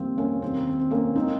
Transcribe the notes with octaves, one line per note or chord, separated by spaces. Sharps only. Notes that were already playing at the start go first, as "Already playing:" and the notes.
Already playing: F2 D#3 G3 A#3 C4
A#3 C#4
D#2 D#3 A#3 C4
C4
C4
A#3 C#4
D#3 G#3 C4 D#4